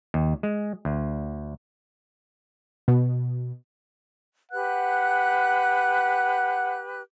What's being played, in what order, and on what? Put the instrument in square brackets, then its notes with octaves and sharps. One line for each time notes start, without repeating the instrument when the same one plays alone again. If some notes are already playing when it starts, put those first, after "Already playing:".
[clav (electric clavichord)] D#2
G#3
D2
[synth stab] B2
[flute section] G4 B4 F#6 [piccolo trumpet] F#5